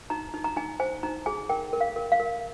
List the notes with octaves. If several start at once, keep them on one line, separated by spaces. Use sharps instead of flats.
D#4 A#5
D#4
A#5
D#4 G#5
C5 G#5
D#4 A#5
G#4 G#5
A#4 G5
A#4
F5
A#4
F5
A#4